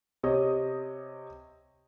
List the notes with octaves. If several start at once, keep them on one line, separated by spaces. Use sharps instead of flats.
C3 C#5 D#5 D#6